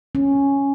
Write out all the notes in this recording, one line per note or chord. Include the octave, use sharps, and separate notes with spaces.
C#4